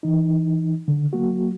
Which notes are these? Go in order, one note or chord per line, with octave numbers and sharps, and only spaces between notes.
E3 D#4
D3
F#3 A#3 F#4